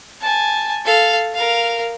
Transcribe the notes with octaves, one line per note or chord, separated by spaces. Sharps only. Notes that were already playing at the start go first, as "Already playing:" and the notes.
G#5 A5
A4 F5
A#4 F5